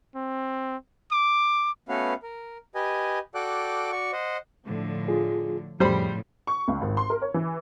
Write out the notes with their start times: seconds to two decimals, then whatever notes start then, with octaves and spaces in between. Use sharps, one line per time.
0.15 C4
1.12 D6
1.89 A3 B3 C#4 F#4 B4 F5
2.23 A#4
2.75 G4 B4 D#5 G#5
3.35 F#4 A4 D5 G5 D6 F#6
3.92 F#4 D5 C#6
4.13 C5 D#5 F#5
4.67 A2 D3 F3
5.08 F4 G#4
5.80 F2 A2 C#3 F3 G3 C5 B5
6.47 C#6
6.68 C#2
6.81 G#1
6.97 C6
7.10 A#4
7.22 C#5
7.34 E3